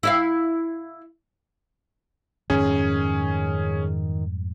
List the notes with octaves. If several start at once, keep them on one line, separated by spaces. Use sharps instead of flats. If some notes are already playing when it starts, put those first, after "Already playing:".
E4 E5 F5
F2 G#2 D#3 G3 C#4 G#4